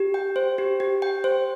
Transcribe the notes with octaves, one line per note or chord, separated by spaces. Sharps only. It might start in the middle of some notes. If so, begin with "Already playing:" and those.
Already playing: G4
G5
C5
G4
G4
G5
C5